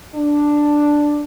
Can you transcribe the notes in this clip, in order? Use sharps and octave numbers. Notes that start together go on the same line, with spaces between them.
D4